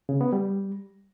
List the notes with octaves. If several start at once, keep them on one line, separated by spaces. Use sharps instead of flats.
C#3
B3
G3